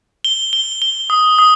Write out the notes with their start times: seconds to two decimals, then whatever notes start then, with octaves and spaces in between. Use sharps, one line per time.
0.25 G7
0.53 G7
0.82 G7
1.10 D#6
1.39 D#6